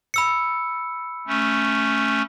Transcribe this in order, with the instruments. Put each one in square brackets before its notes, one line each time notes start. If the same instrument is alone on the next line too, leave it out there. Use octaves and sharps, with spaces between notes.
[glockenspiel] B5 E6 C#7
[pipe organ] A3 C#4